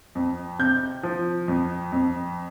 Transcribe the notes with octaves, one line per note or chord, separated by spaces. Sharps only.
F2
C3 G6
F3
F2
F2